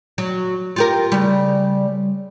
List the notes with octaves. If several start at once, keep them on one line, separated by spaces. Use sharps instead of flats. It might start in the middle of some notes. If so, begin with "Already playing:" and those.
F#3
F4 G4 A#4
C#3 G3